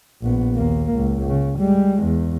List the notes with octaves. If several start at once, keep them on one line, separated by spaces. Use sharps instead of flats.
A#1 B3
D#2 A#3
C#2
C#3
G3 G#3
E2